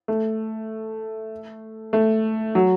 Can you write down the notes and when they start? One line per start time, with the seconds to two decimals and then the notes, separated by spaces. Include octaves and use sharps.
0.08 A3
1.93 A3
2.55 F#3